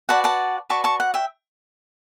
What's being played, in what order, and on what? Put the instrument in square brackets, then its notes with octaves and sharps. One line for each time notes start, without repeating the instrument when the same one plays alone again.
[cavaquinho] F#4 B4 D5 F#5 A5
F#5 A5
F#4 B4 D5 A5 C#6
A5 C#6
F#5
E5 G5